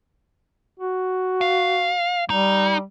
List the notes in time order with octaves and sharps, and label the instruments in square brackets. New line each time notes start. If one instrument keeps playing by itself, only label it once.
[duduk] F#4
[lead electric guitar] F5
[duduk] G3 [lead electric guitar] D#4